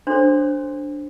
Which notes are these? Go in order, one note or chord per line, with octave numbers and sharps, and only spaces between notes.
D4 F#4 A4 C5 C#5 C6